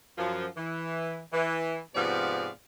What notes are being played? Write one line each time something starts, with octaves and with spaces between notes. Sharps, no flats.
F#2 F3
E3
E3
G#2 C3 F3 B3 D5 F5